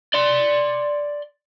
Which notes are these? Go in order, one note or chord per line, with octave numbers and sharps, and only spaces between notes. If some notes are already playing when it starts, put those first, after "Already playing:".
D5 C6